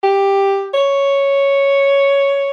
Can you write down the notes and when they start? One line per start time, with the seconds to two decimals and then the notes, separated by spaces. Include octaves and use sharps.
0.04 G4
0.74 C#5